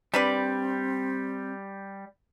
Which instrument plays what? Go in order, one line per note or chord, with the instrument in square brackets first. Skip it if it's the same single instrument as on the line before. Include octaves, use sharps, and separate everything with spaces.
[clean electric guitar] G3 [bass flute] C4 [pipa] D4 B4 D5